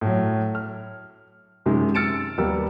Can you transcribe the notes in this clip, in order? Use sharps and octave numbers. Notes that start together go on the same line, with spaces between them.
A2 F#3
F6
F#2 C3 D#3 G#3
E6 F6 A6 C#7 D7 E7
D#2 G3 B3 A#4 E6